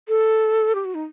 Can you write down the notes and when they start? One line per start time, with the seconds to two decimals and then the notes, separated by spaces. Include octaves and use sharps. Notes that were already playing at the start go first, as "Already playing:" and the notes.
0.09 A4
0.75 G4
0.85 F#4
0.95 D#4